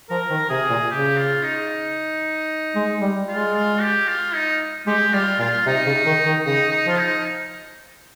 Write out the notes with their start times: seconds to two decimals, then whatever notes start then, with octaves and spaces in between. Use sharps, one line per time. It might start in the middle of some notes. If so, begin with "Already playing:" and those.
0.10 F3 A#4
0.30 D#3
0.50 C3 G#4
0.70 A#2
0.90 C#3 G4
1.17 F4
1.43 D#4
2.75 G#3
3.01 G3
3.28 G#3 F4
3.55 F4
3.81 G4
4.07 F4
4.34 D#4
4.87 G#3 G4
5.13 G3 F4
5.39 A#2 F4
5.66 C3 D#4
5.86 C#3
6.06 D#3
6.26 D#3
6.46 C#3 D#4
6.71 D#4
6.86 F3 F4
6.99 D#4